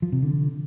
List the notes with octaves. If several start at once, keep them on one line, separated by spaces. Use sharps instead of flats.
F3
C3
D3